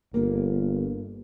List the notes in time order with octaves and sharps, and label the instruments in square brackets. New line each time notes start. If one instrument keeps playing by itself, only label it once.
[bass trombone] G1 [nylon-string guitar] A#3